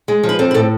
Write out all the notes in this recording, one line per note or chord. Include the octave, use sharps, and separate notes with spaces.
G#3
F3
B4
C4 A4
B4
A2 A4